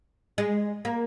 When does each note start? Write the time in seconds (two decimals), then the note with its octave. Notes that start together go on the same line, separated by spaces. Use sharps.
0.38 G#3
0.85 A#3